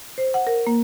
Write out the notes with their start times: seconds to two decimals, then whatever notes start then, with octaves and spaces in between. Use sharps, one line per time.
0.18 C5
0.34 F#5
0.47 A#4
0.67 A#3